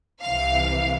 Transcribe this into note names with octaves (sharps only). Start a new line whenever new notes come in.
C2 C3 E3 F5